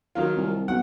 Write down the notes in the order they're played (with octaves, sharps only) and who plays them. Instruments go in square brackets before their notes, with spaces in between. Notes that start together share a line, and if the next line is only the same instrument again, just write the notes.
[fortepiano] D#3 F#3 F4
[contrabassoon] C2
[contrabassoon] B1 [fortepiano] F#5